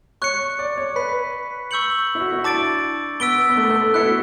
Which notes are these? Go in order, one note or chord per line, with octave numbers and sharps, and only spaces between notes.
C#5 C#6 F#6 C#7
D5
C#5
B4 B5 F#6 B6
C#6 E6 G6 C#7 F#7
E4
F#4
E4
D4 A5 D6 A6 D7
B3 E6 B6 D7 G7
B3
A3
A3
B3
E4 F#6 C#7 G7
F#4